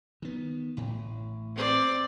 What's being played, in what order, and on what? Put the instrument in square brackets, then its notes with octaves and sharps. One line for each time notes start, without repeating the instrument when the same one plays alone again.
[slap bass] D#3 B3
A1 A2
[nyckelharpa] C4 D5